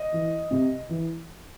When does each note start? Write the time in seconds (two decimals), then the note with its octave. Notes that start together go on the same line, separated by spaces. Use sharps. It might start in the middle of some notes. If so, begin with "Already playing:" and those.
Already playing: D#5
0.13 E3
0.51 C3
0.89 E3